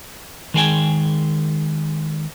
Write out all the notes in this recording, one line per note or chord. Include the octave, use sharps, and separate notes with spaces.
D#3 G#3 G#4 B4 G5 G#5